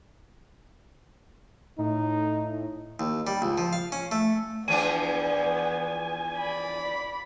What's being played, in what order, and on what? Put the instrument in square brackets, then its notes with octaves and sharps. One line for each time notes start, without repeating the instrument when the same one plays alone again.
[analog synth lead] A2 [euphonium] D#4
[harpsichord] D#2
G3
C#2
F3
F5
C#4
A3
[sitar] E2 F3 D4 [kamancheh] B3 D5 [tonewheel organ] G#5
[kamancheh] D5 B5